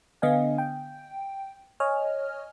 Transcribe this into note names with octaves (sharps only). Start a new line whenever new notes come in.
D3 B3 D#5 F5 G#5
G5
C#5 D#5 G#5 F6